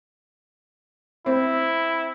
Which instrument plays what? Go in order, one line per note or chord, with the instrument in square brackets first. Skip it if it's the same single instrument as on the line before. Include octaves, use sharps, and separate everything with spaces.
[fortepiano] C4 [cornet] E4